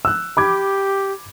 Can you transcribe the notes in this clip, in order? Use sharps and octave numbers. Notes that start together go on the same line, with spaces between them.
E6 F#6
G4 B5 D6 G#6